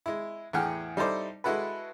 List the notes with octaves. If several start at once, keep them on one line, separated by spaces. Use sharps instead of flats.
G#3 E4
E2 A2 G#4 F#5 G5 F6
G3 D#4 E4 A4 C5 D5
G#3 E4 F#4 A4 B4